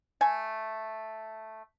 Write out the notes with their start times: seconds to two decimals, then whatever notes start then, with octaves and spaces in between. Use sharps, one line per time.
0.21 A3 G#5